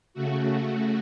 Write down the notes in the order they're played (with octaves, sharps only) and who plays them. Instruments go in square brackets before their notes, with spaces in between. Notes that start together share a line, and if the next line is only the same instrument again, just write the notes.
[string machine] C#3 A3 F#4